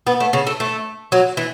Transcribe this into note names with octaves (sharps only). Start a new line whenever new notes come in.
B3
A3
C#3
A3
A3
F#3
E3